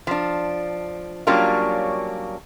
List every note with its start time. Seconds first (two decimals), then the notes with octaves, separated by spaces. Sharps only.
0.07 F3 D4
1.27 F#3 G3 A#3 C#4 D4 F4